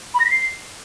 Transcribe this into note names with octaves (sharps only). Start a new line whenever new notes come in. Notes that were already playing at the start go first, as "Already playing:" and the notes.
B5
A#6
B6
C7